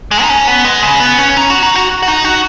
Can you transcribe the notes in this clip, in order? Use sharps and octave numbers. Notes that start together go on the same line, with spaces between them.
G#3
D#4
C#4
B3
G#3
C#3
B3
C#4
D#4
F#4
D#4
F#4
F#4
D#4
F#4